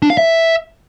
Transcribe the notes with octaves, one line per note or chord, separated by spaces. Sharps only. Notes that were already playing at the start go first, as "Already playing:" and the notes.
D4
F5
E5